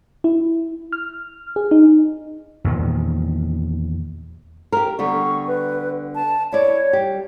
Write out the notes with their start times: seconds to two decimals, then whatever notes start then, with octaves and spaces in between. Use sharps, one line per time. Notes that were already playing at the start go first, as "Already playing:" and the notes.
0.24 E4
0.92 F6
1.56 G#4
1.71 D#4
2.64 E2 A#2 D#3 F3
4.72 G4 A#4
4.99 D3 G3 B3 C#6
5.48 B4
6.15 A5
6.52 E4 C#5 D5
6.93 G3 G4